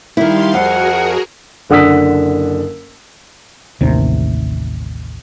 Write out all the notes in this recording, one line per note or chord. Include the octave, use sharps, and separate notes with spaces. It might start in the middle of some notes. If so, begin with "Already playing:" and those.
D#3 G3 E4 F5 C6
F2 F#4 G#4 A#4 F#5
F#1 D3 F#5 D#6 E6 B6
A1 D#2 C3